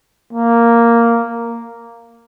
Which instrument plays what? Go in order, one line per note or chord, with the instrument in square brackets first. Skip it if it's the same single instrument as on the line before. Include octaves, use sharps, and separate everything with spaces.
[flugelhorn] A#3